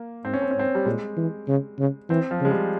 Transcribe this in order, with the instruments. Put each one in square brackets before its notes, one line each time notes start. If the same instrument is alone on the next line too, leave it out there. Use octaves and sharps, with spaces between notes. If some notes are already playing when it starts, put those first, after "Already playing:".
Already playing: [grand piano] A#3
[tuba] G#2 [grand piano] C4
[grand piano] C#4
C4
C#4
[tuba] G#2
[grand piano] C4
G3
[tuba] A#2 [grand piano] G#3
[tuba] E3
C#3
C#3
[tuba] E3 [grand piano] C4
[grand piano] F3
[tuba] C#3 [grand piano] G#3
[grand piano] G3